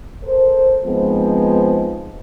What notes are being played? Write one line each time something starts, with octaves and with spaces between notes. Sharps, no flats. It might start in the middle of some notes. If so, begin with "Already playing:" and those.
A4 A#4 C5
F3 G#3 B3 C4 D#4